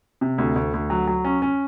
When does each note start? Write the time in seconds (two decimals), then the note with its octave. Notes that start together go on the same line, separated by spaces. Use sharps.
0.21 C3
0.38 D2
0.56 D2
0.74 D2
0.90 F#3
1.07 F#3
1.25 C#4
1.42 C#4